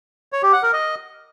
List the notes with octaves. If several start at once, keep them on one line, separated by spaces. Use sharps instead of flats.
C#5
G4
F#5
A#4
D#5